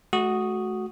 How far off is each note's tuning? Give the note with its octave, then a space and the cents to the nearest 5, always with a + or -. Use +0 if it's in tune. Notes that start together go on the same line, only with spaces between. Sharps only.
A3 -35 F#4 +0 D#6 +0